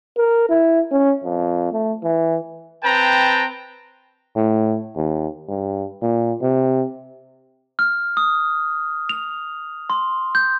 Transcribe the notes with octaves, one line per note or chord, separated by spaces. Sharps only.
A#4
E4
C#4
F2
A3
E3
C4 B4 G5 A5 A#5
A2
D#2
G2
A#2
C3
F6
D#6
F7
C6
G6